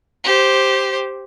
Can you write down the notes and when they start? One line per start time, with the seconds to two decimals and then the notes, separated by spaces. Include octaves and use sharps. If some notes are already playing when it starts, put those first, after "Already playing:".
0.24 G4 C5